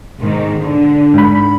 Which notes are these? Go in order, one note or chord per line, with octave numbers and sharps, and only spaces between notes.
B1 G#2 D#3
D3
G#2 B5